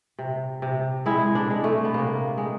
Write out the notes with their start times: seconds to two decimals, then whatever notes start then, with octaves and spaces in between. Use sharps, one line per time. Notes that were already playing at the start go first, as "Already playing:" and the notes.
0.19 C3
0.62 C3
1.06 G#3 E4
1.35 D4
1.50 G#3
1.64 A3
1.85 B3
1.94 C3 A#3
2.38 G#3